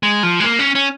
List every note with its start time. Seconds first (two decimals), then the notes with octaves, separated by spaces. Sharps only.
0.03 G#3
0.23 F3
0.40 G#3
0.44 A#3
0.59 C#4
0.75 C#4